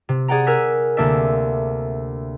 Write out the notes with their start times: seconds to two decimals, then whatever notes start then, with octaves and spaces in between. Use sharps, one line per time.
0.09 C3
0.28 G#4 D5 F#5 G5 A#5
0.46 A#4 G#5 E6 F#6 B6
0.97 D2 C3 A#3 D4 E5